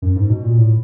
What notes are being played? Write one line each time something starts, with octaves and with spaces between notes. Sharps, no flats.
F#2
G#2
B2
A#2
A2